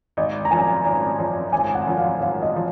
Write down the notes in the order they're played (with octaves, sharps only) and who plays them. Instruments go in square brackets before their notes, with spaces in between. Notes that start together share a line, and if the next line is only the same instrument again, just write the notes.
[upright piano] G#1 [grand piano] D#5
[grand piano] A#5
[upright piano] F#2 F3 [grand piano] G#5
[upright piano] G#1 [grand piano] A#5
[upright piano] F#2 F3
[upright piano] G#1 [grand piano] G#5
[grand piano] F#5
[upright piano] F#2 F3
[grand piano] F5
[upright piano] G#1 [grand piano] F5
[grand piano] D#5
[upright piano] F3